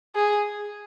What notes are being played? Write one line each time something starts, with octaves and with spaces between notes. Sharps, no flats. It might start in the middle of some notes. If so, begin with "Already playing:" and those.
G#4